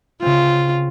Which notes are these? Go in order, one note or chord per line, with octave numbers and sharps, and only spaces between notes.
C#3 C4 F4